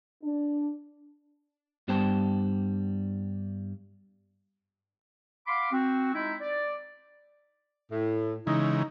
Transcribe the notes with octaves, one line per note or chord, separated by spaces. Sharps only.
D4
G2 G3 B3 C5 G5 A5
F5 F#5 B5 C6 D6
C4 F#4
G#3 D#4 E4
D5
A2
C#3 E3 G#3 D#4